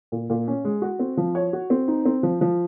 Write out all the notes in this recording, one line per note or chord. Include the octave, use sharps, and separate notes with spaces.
A#2
A#2
C#4
G#3
F#4
C4
F3
C#5
F#4
C4
D#4
C4
F3
F3